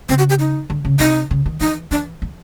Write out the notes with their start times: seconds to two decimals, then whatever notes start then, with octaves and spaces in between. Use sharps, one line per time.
0.09 C#3 C4
0.18 F#4
0.30 G4
0.39 D#4
0.70 D3
0.85 C#3
0.99 C3 D#4
1.31 C#3
1.46 D#3
1.61 E3 D#4
1.91 E3 D4
2.22 F3